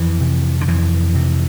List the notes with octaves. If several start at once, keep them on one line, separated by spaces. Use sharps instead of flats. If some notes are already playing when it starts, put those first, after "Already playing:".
Already playing: F2 E3
C3
D3
F2 E3
C3